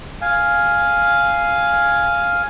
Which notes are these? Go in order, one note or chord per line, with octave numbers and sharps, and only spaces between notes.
F5 G#5